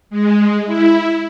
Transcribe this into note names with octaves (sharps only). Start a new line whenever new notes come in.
G#3
E4